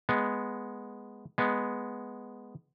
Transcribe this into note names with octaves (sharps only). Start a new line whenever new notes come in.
G#3 B3
G#3 B3